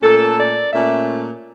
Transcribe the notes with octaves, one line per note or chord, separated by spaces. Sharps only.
A#2 A3 C#4 A4
D5
A#2 A3 C#4 E5